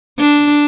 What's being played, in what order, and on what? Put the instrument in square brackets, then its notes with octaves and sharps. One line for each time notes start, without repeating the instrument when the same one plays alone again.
[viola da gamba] D4